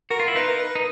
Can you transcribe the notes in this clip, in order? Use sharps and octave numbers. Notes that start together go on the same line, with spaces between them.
F#4 A#4
F4
E4
D#4 F4 B4
A#4
B4
D#4